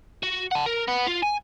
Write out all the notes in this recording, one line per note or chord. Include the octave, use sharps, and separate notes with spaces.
F#4
F#5 A5
A#4
B3
F4
G#5